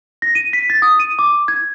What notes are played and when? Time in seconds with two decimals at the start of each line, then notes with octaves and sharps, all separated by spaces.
0.22 A#6
0.35 D#7
0.53 B6
0.70 A6
0.82 D#6
1.00 D#7
1.19 D6
1.48 G#6